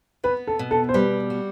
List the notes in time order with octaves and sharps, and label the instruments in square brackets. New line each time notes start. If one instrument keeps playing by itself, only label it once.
[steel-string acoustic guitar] B3 [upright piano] B4
[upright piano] A4
[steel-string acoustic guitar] B2
[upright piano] A4
C5
[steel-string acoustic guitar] G3 [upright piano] B4
[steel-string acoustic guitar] F#4